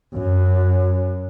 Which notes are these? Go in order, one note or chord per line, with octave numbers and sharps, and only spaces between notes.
F#2